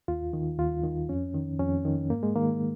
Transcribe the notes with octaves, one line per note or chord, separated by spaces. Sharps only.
D#2 F4
D#3
D#2 F4
D#3
F2 C#4
D#3
F2 C#4
D#3
G#2 A#3
G#3
D#3 A#3